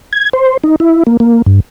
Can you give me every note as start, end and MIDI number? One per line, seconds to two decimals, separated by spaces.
0.13 0.30 92
0.33 0.57 72
0.64 0.76 63
0.80 1.03 64
1.07 1.17 58
1.20 1.42 58
1.46 1.60 43